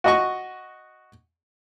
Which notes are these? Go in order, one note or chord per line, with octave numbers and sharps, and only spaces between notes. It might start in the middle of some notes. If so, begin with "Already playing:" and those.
F#4 D#5 C#6